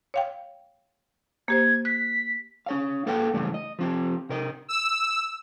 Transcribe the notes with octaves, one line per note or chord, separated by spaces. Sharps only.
C#5 F5 G5
A#3 G4 C5 G#6
F#6 B6
C#4 C#5 F5
A#3 A4 B4 F5 G5
E2 G2 C#3 E3 A3
D#5
F3 C4 G4
C3 A#4 D#5
E6